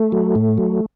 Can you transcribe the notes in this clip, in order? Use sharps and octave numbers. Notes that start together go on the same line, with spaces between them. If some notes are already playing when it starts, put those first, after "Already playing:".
Already playing: A3
F#3
A2
F#3